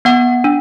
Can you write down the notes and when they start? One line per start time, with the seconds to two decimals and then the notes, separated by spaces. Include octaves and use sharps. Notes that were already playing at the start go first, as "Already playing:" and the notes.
0.05 B3 F#5
0.44 D4